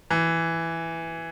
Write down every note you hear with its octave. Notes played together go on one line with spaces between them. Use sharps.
E3